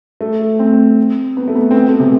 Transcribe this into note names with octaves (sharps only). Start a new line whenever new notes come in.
A3
C4
B3
A3
B3
C4
B3
A3
C3